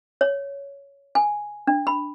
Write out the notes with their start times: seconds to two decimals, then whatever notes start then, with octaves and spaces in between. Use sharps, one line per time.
0.21 C#5
1.15 G#5
1.67 D4
1.87 B5